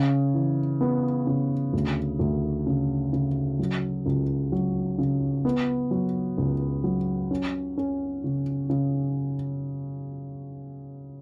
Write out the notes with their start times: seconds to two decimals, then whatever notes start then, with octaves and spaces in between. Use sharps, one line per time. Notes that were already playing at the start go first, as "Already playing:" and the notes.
Already playing: C#3
0.34 E3
0.81 B3
1.27 C#3
1.73 D2
2.19 D2
2.66 C#3
3.13 C#3
3.59 F#3
4.06 C#2
4.52 F#3
4.98 C#3
5.45 B3
5.91 F#3
6.38 C#2
6.84 F#3
7.31 C#4
7.77 C#4
8.24 C#3
8.70 C#3